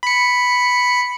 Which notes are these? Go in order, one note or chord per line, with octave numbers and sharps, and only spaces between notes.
B5 C#7